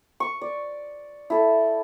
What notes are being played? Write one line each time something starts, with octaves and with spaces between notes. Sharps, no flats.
C#6
D5
E4 A4